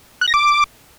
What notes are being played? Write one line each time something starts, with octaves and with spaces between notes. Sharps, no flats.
F#6
A#6
D6